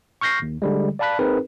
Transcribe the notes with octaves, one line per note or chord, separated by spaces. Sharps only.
C#6 F6 G6 A#6 C7
D#2
D3 G3 G#3
D5 F5 A5 B5 F#6 B6
C4 D#4 G#4 A#4 B4